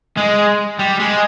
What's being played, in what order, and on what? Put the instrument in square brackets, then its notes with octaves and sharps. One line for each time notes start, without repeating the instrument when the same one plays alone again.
[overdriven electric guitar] G#3
G3
G#3